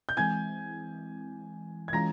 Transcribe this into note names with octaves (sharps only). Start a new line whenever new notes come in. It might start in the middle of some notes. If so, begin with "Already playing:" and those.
G6
E3 G#3 C4 E4 G#5 G#6
G#6
E3 G#3 C#4 F4 A#5 A#6